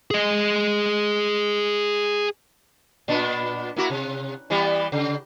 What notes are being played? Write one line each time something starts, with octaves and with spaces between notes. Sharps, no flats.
G#4 D#5
A#2 B3 D4
A#3 E4 F#4
C3
E3 G3 B3
C#3